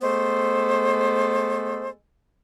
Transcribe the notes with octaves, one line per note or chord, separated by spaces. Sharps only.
G#3 A3 B3 A4 C5